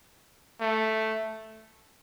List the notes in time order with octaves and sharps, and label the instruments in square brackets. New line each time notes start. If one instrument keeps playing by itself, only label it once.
[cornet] A3